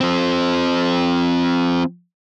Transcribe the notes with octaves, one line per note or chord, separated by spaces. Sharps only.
F3 C4